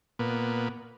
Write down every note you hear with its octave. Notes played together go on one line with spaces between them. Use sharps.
A#2 B3